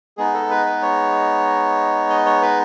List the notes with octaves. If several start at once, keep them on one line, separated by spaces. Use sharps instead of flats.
G#3 B3 D#4 G#4
A4
B4
B4
C#5
D#5
C#5
B4